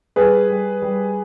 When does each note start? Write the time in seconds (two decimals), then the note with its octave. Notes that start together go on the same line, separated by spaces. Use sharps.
0.16 G3 G#4 B4
0.50 G3
0.82 G3